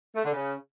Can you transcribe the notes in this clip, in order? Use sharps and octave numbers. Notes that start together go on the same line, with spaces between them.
A3
D3
C#3